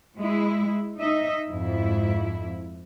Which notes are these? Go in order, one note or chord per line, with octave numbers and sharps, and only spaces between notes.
G#3 E4
D#4 D#5 E5
F2 G#2 E4